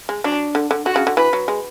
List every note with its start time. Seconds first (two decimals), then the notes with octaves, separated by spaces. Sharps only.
0.09 G#3
0.24 F#3 D4
0.55 D3
0.71 D3
0.86 D3 F#4
0.96 C#3
1.07 D3
1.17 E3 B4
1.33 F#3
1.48 G#3